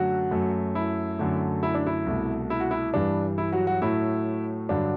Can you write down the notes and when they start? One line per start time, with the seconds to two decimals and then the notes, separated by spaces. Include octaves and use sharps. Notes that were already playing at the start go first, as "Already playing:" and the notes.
Already playing: F#2 D3 F#3 A3 F#4
0.31 F#2 F#3 A3
0.75 E4
1.19 F#2 D3 F#3 A3
1.63 E4
1.75 D4
1.87 E4
2.06 C2 B2 A3
2.50 E4
2.60 F#4
2.71 E4
2.94 G2 E3 G3 D4
3.38 E4
3.52 F#3 F#4
3.67 F#3 F#4
3.82 A2 F#3 A3 E4
4.69 G2 D3 F#3 D4